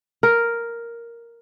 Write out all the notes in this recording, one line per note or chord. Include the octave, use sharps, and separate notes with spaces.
A#4